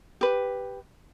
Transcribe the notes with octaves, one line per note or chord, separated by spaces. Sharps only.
G4 B4